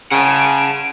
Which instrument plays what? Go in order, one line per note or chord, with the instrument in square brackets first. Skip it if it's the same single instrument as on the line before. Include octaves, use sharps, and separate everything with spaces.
[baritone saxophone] C#3 [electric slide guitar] F#5 A5 [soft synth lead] D7